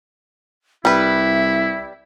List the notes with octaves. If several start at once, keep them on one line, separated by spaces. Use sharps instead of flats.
C2 G3 E4 B4 E5